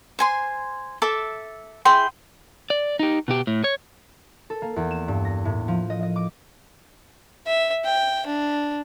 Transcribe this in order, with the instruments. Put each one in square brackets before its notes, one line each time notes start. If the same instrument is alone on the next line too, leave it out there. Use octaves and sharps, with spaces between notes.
[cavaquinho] C5 G#5 C6
A4 E5 A5 D6
E4 G#4 G5 C6
[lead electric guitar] D5
D#4 G4
B2 G4
A2
C#5
[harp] A4
A#3
E2
E7
G2
A#6
A2
F3
D#5
D#5
D6
[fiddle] E5
G5
D4